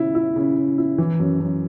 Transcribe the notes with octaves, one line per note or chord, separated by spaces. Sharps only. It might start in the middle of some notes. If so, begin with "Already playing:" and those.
Already playing: C#3 E4
E4
C#3
C#3
E4
E3
F#2
F#2